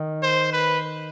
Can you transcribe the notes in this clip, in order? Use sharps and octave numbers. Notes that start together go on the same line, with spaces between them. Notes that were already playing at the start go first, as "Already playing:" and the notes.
Already playing: D#3
C5
B4